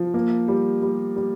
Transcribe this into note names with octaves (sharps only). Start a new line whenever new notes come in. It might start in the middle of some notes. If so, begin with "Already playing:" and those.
Already playing: F3
A#3
G3
G3
G3